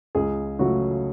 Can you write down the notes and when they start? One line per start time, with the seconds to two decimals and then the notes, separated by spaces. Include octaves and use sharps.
0.15 C#2 G#4
0.59 C#3 F#3 A3 F#4